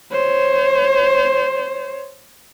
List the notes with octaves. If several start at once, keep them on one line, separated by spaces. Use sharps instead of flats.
C5 C#5